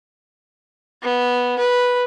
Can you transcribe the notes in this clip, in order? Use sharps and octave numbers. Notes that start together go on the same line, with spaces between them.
B3
B4